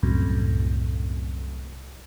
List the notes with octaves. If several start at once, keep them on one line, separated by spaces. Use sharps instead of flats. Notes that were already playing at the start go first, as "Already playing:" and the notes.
C2 F#2 A2